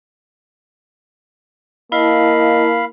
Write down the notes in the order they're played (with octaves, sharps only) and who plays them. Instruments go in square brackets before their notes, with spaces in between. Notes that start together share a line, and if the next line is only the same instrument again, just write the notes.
[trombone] A#3 [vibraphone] E4 A5 [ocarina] D#5 [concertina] F5 B5